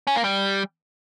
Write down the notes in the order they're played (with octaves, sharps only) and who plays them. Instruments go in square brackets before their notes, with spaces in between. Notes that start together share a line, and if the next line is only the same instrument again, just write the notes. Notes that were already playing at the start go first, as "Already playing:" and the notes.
[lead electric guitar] C#4
A#3
G3